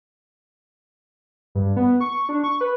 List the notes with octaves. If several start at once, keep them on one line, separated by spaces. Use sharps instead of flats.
G2
B3
C#6
D4
C#6
B4